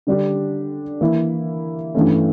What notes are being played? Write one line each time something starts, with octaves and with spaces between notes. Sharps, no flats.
D3 G3 D4 G4
E3 A#3 E4
G2 E3 A3 C#4